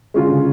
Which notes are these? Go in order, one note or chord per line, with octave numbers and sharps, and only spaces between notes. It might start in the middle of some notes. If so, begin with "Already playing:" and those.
D3 G#3 C#4 F4
C#3